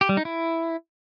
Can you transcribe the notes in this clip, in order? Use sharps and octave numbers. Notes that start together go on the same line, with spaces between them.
G4
G3
D#4
E4